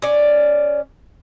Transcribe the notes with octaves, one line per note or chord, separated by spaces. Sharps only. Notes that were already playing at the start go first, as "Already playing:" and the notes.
C#4 D5